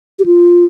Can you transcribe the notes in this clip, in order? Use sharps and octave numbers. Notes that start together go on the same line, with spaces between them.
G4
F4